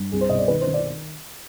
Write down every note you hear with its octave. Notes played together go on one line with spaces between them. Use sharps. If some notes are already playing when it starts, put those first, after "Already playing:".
Already playing: G2
C2 G#4
C5
B2 D#5
D5
D#3 B4
C5
D#3
D5